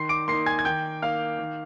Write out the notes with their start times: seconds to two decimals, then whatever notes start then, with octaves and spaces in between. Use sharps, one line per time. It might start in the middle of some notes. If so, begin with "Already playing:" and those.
Already playing: D#3 C6 C7
0.09 D6 D7
0.28 A#3 D#4 C6 C7
0.46 G#5 G#6
0.59 G#6
0.65 D#3 G5 G6
1.02 A#3 D#4 F5 F6
1.39 D#3